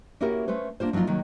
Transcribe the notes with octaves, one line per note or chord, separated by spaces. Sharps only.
A#3 C#4 E4 F#4 G4 A#4
A3 C#4 B4 C5
A#3 D4 F4 C5
F3 F#3 A#3 D#4 F4
C3 D#3 F#3 A#3